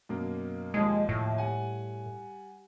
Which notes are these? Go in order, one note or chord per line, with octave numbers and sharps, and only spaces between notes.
F#2 B2 A#3
D#2 F3 G#3 D#5
A2
G3 F#5 G#5